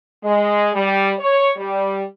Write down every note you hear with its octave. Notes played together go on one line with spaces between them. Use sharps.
G#3
G3
C#5
G3